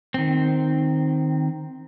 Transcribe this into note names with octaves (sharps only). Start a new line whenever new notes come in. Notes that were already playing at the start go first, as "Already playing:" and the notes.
D#3 C4